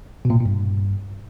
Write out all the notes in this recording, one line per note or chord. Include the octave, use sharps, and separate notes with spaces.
B2
A#2
A2
A#2
G2